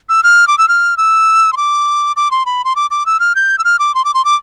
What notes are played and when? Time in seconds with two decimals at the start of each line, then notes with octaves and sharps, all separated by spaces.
0.09 E6
0.23 F6
0.48 D6
0.58 E6
0.68 F6
0.97 E6
1.53 C6
1.57 D6
2.16 D6
2.31 C6
2.46 B5
2.65 C6
2.76 D6
2.91 D6
3.06 E6
3.20 F6
3.35 G6
3.58 E6
3.64 F6
3.79 D6
3.95 C6
4.05 D6
4.14 C6
4.25 D6